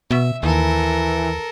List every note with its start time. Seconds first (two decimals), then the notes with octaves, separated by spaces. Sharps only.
0.11 B2 E5
0.43 D#2 E3 A4 A#4